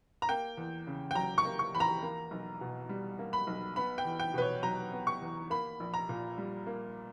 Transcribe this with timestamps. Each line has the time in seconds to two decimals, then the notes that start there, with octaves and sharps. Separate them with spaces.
0.22 A#5
0.29 A#3 G5
0.57 E2
0.87 C#3
1.11 G5
1.15 F#3 A#5
1.38 C#6
1.45 A#3
1.59 C#6
1.74 E2 B5
1.80 A#5
2.03 A#3
2.31 B1
2.61 B2
2.89 G3
3.19 A#3
3.33 B5
3.47 B1
3.76 B3 B5
3.98 G5
4.05 E2
4.20 G5
4.34 B2 B4
4.42 C#5
4.63 F#3 A#5
4.92 B3
5.07 C#6
5.22 E2
5.50 A#3 B5
5.80 A#1
5.94 A#5
6.09 A#2
6.38 G3
6.67 A#3